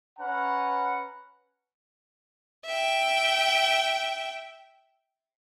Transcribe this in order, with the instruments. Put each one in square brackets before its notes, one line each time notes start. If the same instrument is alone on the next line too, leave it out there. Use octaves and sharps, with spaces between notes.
[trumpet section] C#4 B4 F#5 A#5
[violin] E5 G5